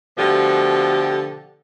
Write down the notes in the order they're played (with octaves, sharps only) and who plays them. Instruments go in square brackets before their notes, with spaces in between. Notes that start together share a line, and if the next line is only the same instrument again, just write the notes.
[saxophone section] B2 D3 F3 A3 G4